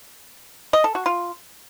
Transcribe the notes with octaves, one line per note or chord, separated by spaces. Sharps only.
D#5
A4
F#4
F4